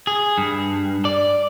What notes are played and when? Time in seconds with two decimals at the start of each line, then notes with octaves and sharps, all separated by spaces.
0.07 G#4
0.38 G2
1.05 D5